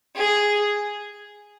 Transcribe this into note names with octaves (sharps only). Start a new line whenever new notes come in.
G#4